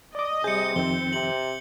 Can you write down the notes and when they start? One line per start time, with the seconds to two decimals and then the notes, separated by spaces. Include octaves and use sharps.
0.15 D5 D#5 D6
0.44 C3 G3 G#4 G6 C#7
0.76 F2 D#3 C4 G7
1.13 C3 F#7